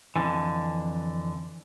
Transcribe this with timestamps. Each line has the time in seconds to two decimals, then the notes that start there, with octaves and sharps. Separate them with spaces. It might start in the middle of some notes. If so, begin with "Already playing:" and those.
0.16 F2 B2 D3 E3